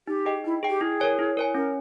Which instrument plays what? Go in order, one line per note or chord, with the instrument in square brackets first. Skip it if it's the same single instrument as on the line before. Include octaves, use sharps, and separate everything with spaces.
[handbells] D#4 [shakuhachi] G4
[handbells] G#4 D#5 G5
[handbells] D#4 [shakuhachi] E4
[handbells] G#4 D#5 G5
[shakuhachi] G4
[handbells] E4 [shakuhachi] G#4
[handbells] A#4 C#5 G#5
E4
A#4 C#5 G#5
[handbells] C#4 [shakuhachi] A#4